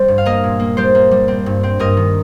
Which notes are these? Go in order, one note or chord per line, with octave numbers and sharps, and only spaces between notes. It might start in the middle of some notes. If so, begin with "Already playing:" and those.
Already playing: G3 C4 C5
G2
F5
A#3 A#4 D#5
A#2
A#3
G3 G4 C5
A#3
G3
C4
G2
C4
G2 A#4 D#5
D#3